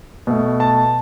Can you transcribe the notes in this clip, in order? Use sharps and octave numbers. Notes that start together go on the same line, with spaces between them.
B2 A3
A5